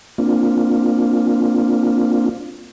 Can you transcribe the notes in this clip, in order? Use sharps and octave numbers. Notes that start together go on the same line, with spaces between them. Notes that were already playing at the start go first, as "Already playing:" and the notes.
A#3 C4 D4 F4